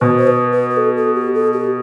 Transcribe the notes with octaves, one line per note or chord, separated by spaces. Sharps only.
B2 B4
C5
B4
B4
B4
A4
A4
G4
A4
G4